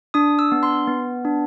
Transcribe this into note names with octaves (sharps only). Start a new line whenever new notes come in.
D4 D#6
E6
B3
C6
B3
D4